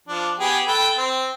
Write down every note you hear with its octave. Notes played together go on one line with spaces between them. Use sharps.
F3 D4
B3 G4 G#4
A4 B4 G5
C4